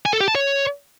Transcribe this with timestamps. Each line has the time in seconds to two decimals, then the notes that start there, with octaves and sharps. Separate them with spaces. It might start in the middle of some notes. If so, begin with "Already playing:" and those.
0.06 G#5
0.13 A4
0.20 G4
0.28 A5
0.35 C#5